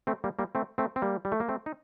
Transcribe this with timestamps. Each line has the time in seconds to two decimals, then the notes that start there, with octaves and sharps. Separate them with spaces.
0.07 A3 C4
0.24 G3 A#3
0.39 G3 A#3
0.55 A3 C4
0.78 A3 C4
0.96 C4
1.02 G3 A#3
1.25 G3
1.32 A3
1.40 A#3
1.49 A3 C4
1.66 D#4